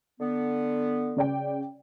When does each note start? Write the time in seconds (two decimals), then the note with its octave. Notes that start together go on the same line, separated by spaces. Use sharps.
0.20 D3 B3
1.17 C#3 D5 G5